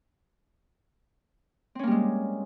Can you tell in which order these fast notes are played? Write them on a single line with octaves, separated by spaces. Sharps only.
C4 C#4 A#3 G3 G#3